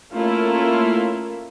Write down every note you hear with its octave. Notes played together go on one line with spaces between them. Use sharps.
A3 A#3 C#4 E4 F4 A#4